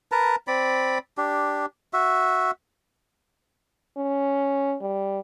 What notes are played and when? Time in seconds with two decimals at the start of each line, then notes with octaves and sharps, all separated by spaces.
0.12 A#4 B4 A5 A#5
0.47 C4 D5 B5
1.17 D4 G4
1.93 F#4 E5
3.97 C#4
4.81 G3